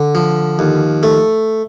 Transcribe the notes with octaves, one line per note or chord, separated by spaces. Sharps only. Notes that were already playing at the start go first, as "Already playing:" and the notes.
Already playing: D3
F3
D#2
A3